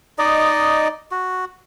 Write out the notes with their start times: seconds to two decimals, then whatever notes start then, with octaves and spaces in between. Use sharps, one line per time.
0.19 D#4 D5 D#5
1.11 F#4